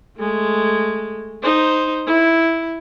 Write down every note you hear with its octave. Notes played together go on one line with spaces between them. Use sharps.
G#3 A3
D#4 C5
E4